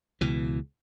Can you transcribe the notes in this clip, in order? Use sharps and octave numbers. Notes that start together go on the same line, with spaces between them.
C#2 B2 E3